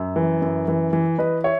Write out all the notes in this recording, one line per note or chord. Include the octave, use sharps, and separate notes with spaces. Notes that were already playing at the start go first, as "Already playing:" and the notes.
Already playing: F#2
E3
F#2
E3
E3
E3 B4 D#5
C#5 E5